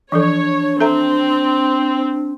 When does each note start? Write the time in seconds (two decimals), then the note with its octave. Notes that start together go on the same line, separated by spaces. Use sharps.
0.12 E3 F3 D4 A4 C#5
0.80 C4 A4 E5 A#5